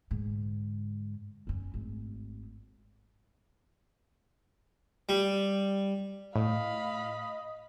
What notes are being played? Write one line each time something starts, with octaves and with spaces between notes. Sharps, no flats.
G#2 D3
F#2 C#4
G#1 A3
G3
A2 D#5 F5 B5